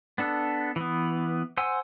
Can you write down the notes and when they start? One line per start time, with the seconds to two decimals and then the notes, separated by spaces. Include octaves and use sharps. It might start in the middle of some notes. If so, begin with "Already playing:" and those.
0.18 B3 D4 A4
0.76 E3 B3
1.57 C5 F#5 G#5 C6 E6